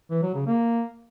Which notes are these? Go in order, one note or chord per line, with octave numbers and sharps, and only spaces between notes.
E3
F#3
C#3
A#3